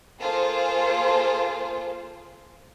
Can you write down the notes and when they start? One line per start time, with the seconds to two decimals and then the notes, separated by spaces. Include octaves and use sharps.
0.21 A#3 F4 G#4 A4 C5